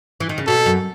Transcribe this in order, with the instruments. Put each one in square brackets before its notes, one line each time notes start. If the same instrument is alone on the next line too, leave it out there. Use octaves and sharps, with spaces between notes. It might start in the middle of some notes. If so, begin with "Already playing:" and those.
[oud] E3
D#3
C#3
[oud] B2 [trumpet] A4
[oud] F#2